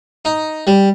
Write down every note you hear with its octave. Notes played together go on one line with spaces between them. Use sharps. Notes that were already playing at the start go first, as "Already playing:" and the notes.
D#4
G3